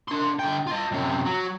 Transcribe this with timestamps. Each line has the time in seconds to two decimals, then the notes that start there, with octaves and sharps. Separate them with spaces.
0.08 D4 C6
0.39 D3 G5
0.67 F4 D#5
0.92 F#2 C3
1.25 F#3